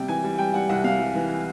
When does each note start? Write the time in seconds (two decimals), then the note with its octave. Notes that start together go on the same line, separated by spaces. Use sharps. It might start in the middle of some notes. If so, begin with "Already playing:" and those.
Already playing: C3 G3 G5
0.08 E3 G#5
0.24 G3
0.38 G3 G5
0.54 G3 F#5
0.69 C2 F#5
0.84 C3 F5
1.00 G3
1.15 E3